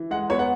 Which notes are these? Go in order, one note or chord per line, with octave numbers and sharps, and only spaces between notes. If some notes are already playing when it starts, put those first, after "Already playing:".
Already playing: E3
G#3 F#5
B3 C#5
F#5